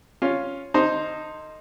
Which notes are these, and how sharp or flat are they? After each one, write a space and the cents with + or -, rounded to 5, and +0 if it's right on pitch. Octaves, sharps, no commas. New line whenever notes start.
C#4 +0 F4 +0
D3 +35 D#4 +0 C5 +0